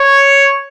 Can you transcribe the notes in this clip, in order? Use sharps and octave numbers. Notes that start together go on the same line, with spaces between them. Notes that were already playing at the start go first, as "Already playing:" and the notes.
Already playing: C#5